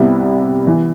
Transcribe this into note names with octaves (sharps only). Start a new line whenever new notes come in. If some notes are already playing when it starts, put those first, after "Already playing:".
Already playing: C2 C3 G3 B3 E4
E3 B3